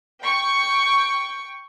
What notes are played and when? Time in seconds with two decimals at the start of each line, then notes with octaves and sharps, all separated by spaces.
0.22 G5 C#6